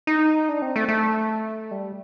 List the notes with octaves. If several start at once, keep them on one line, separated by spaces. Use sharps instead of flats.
D#4
D4
C4
A3
A3
G3